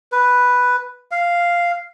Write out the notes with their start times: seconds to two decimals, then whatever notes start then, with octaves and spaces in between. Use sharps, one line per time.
0.12 B4
1.11 F5